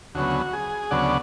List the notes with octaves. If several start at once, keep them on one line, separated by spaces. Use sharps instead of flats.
D2 C#3 F#3 B3 F#4
G#4
D2 C#3 F#3 B3 D5 F#5